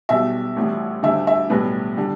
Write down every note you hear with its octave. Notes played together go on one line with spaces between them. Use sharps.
B1 B2 G3 E5
A1 A2 G3
D2 D3 G3 E5
E5
B1 A2 G3 B4
D3 G3